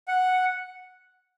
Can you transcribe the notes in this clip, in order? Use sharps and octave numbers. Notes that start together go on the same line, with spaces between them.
F#5